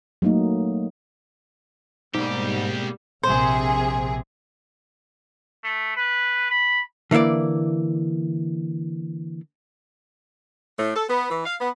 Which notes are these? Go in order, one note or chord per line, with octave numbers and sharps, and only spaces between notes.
F#3 A3 A#3 D#4
C2 G#2 B2 G3 G#3 A#3 G4
A#1 C3 G#4 C5
A3
B4
B5
D3 E3 A#3 E4 D5
A2
A4
B3
E3
F5
B3